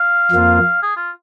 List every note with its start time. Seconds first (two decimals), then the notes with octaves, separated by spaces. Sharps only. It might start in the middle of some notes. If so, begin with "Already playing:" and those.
Already playing: F5
0.31 F2 F3 A#3 F4
0.83 G#4
0.97 F4